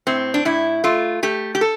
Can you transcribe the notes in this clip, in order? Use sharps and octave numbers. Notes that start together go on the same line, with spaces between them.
A2 C4
D4
A2 E4
A3 F4
A3 G4
G4
A4